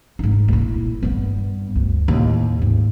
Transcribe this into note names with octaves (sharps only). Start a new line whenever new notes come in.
G#2 D#4
A#1 E4
G2 B3
D2
D#2 A2
G#2